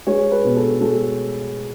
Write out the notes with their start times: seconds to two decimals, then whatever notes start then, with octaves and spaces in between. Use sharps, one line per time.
0.07 G#3 C#5
0.31 B4
0.45 B2
0.56 A4
0.81 G#3 A4